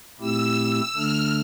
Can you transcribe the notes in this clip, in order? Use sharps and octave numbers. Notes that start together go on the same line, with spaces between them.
A#2 A3 C4 E4 G4 E6
D3 A3 D4 F6